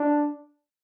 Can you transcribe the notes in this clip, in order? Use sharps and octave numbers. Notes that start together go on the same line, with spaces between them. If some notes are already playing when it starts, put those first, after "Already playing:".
Already playing: D4